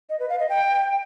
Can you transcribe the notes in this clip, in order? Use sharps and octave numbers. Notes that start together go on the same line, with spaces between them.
D#5
B4
F5
D#5
G5